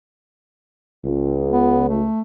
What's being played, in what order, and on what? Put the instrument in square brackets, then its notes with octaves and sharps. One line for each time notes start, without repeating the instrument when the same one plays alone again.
[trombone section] C#2
[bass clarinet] B3
A3